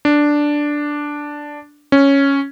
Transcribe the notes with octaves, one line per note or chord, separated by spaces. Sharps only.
D4
C#4